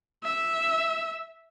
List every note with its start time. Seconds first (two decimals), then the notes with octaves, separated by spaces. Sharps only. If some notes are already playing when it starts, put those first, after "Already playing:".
0.24 E5